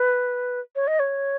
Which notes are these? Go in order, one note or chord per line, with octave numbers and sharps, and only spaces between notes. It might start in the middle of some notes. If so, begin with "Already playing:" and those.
Already playing: B4
C#5
D#5
C#5